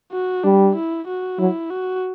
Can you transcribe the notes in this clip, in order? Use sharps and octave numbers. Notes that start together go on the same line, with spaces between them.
F#4
G3 D4
E4
F#4
F#3 E4
F#4